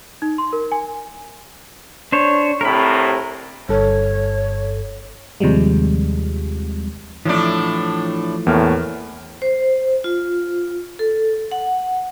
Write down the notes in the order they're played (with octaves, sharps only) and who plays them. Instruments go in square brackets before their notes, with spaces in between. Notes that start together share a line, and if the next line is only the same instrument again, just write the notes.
[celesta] D#4
C6
A#4
G#5
[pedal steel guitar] D4 C5 C#5
[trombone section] C2 A2 C3 [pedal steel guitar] A#4 B5
[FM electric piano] G1 G2 A4 [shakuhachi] C#5
[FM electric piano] D#2 C3 F3 G3 G#3
[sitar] A2 D4 [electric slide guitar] E3 F3 A3
[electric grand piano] E2 A#3 F6 [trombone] A2
[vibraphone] C5
F4
A4
F#5